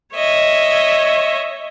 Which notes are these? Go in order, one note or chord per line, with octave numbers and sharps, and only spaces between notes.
C#5 D#5 E5